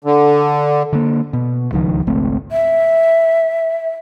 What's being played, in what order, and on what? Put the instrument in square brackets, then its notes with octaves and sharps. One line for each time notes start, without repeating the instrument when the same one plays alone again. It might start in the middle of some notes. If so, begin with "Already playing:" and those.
[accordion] D3
[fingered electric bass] D3 A#3
B2
D1 C#2 D#3 F3
G#1 C#2 A3 C4
[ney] E5